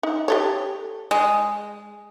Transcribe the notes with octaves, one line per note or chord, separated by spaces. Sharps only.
D#4
G4 A4 C#5
G#3